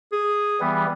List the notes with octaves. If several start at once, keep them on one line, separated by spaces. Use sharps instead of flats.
G#4
E3 G3 B3